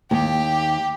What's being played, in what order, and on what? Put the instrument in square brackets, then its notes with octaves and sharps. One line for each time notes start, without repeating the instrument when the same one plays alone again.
[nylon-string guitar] D#2 [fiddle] G4